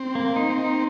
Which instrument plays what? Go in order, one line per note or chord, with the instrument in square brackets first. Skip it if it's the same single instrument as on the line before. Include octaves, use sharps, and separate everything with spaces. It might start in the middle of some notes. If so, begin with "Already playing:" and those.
Already playing: [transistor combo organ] C4
[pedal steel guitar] A#3
D#4
D#4